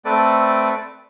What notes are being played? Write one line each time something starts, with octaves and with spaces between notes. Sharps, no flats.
A3 C4 A4 B4 D5 D6